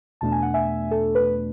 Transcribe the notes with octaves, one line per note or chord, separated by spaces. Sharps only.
E2 B2 A3 D4 A5
G#5
F#5
E5 G#5
A4
B4